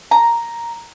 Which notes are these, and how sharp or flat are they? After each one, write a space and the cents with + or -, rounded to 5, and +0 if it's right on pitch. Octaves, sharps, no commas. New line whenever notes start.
A#5 +5